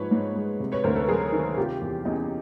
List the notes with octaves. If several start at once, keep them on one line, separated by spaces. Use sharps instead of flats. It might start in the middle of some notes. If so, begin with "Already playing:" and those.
Already playing: G#2 F3 B4 C#5
G#2
G#3
C3
B4 C#5
D2 A#4 C5
A4 B4
F#3 G#4 A#4
D#3
C3 F4 G4
E2
E2 C#4 D#4